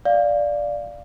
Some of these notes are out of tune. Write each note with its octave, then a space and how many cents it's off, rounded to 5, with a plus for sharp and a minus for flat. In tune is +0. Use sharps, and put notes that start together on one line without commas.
D5 +0 F5 +0